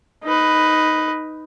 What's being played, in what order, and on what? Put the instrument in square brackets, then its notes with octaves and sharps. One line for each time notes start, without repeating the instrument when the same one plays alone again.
[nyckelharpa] D#4 B4